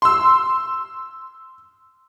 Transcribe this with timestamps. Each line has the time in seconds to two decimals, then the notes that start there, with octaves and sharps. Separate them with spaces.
0.02 C6 E6